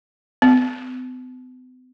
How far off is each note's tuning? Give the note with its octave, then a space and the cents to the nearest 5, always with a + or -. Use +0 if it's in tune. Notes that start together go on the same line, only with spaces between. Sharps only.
B3 +45